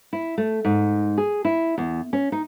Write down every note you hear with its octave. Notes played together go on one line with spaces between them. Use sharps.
E4
A3
G#2
G#4
E4
E2
C#4
D#4